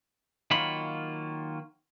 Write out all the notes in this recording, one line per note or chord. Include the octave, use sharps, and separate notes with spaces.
D#3 F#3 A#3 F4 C#5 B5